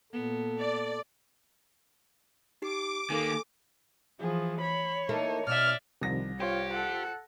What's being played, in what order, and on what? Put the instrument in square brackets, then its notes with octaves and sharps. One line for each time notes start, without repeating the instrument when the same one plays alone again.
[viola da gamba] A#2 B3 [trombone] A4
[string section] D5
[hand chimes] D#4 G4 C7 [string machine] D6
[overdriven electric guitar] D#3 A#3 [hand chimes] A4 G#5
[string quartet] E3 F3 [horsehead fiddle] G#4
[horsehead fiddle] C#5 [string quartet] B5
[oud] A#3 E4 A4 [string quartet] D#4
[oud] B2 D#4 [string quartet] D5 E5 [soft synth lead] F6
[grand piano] C2 A#6 [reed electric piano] C3 D#3 F3
[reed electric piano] F4 C5 G5 [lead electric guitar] G4 [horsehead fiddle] C#5
[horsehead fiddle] A4 F#5